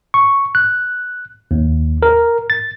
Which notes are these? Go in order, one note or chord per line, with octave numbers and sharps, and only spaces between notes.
C#6
F#6
D#2
A#4
A6